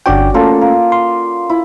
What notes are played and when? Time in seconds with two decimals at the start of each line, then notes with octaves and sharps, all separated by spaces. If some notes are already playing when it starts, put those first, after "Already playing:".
0.06 G1 C#4 D4 F#4 D5 G5
0.34 A3 A#3 C#4 F4 A4
0.61 A#3
0.92 C6
1.50 E4